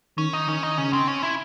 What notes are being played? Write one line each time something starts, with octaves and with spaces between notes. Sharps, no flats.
D#3 C#4
D#4
D#3 C#4
D#4
C#3 C#4
C4
C#4
E4